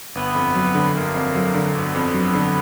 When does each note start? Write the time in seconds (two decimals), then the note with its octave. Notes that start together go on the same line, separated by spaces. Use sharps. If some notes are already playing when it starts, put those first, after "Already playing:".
0.15 G1 B3
0.35 F2
0.55 F#3
0.75 D3
0.95 G1 A#3
1.15 F2
1.35 F#3
1.55 D3
1.75 G1 B3
1.95 F2
2.14 F#3
2.35 D3